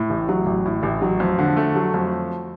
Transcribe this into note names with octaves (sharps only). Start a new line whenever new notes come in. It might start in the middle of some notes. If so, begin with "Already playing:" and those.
Already playing: A2
A1
F#3
A1
A2
A1
F#3
F2
D3
A3
F#3
F2